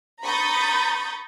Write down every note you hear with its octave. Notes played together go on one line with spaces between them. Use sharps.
A#5 B5 C#6 D#6 G6 A6